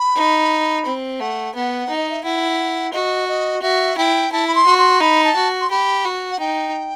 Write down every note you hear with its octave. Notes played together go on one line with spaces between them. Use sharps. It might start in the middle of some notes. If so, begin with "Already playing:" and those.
Already playing: B5
D#4
C4
A3 F#5
B3 F#5
D#4
D#5
E5
E4 F#5
F#4 D#5
D#5
F#4 E5
E4 G5
E4 A5
B5
C6
F#4
C6
D#4 B5
A5
F#4
C6
G4 B5
F#4
F#5
D#4 G5